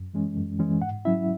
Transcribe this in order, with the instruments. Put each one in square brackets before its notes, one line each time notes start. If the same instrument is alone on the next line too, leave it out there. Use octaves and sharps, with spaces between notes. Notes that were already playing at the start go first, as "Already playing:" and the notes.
Already playing: [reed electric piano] F#2
E3 G#3 C#4
F#2
E3 G#3 C#4
G#2 F#5
F#3 C#4 E4 E5